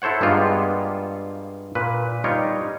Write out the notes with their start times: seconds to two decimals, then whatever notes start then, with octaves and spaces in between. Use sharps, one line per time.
0.02 E4 A4 C5 C#5 F#5
0.21 G2 G3 G#3 A#3 B3 F4
1.75 A#2 B4
2.24 G3 D#4 F4 C#5 G5